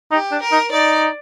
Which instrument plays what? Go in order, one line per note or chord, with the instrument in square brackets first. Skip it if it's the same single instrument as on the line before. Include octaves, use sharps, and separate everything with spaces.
[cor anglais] D#4 [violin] G4
[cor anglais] D4
[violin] A#4
[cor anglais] D#4
[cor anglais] D#4 [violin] D5